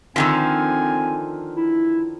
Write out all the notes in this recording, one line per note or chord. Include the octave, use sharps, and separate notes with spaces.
D3 D#3 F3 C4 G#5
E4